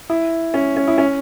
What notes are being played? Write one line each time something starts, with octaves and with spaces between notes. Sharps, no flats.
E4
C#4
C#4
E4
C#4